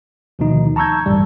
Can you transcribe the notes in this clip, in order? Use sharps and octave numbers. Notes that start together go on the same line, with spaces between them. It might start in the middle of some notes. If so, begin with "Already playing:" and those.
D2 B2 D#3 F3 D#4
A5 A#5 C#6 E6 G6 G#6
A1 D2 G2 G3